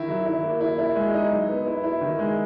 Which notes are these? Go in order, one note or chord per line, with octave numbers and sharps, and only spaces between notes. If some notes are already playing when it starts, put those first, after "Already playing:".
Already playing: D#3 E4
F#3
E4
A#3
E4
E4
G#3
D#4
F#3
B3
E4
E4
D#3
G#3